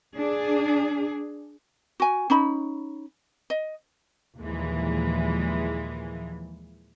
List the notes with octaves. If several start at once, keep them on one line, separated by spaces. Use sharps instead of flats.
D4 G#4
F#4 G#5
C#4 D#4 B5
D#5
D#2 A#2 E3 F3 G#3